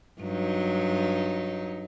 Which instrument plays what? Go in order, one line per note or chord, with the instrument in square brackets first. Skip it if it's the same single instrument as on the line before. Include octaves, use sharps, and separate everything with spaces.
[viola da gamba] G2 F#3 D#4